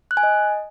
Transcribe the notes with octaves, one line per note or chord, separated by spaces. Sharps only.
F#6
G#5
D#5